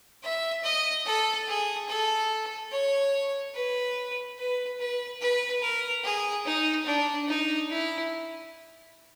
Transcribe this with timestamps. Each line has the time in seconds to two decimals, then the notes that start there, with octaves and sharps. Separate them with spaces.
0.23 E5
0.64 D#5
1.05 A4
1.47 G#4
1.88 A4
2.71 C#5
3.54 B4
4.38 B4
4.79 B4
5.21 B4
5.62 A#4
6.04 G#4
6.45 D#4
6.86 D4
7.28 D#4
7.70 E4